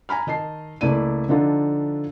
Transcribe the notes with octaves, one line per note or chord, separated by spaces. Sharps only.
G#5 A#5 B5 F6
D#3 D#5 A5 C7
C#2 A3 A#3 E4 D5 D#7
D3 F3 D4 D#4 F4 A4